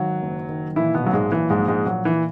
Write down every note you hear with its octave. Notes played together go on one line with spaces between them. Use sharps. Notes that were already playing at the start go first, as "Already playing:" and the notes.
Already playing: G#1 D#3 F#3 F#4
F#1
D#3
A#2 E3 E4
B2 B3
B1 F#3
G#2 G#3
A#2 E3
G#2 G#3
A#1
G#2 G#3
A#2 F#3
E3